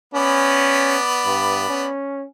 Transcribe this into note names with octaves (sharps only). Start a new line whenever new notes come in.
B3 C#4 D5 B5
G2
C#4